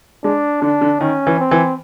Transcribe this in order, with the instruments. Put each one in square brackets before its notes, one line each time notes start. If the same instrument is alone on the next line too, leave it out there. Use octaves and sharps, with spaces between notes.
[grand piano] G#3 [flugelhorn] D4
[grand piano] D3 [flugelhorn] D4
[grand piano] D3
[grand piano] D#3 [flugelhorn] C#4
[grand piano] E3
[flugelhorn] C4
[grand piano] E3